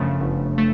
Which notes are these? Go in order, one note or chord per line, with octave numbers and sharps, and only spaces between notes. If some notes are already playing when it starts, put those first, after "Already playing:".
Already playing: G1 F#2 C#3 F3 A3
G1
A3